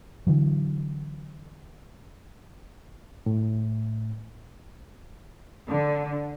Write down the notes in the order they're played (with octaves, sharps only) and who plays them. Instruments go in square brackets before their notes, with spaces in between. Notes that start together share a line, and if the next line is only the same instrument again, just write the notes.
[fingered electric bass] D3 E3 F#3
[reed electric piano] A2
[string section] D3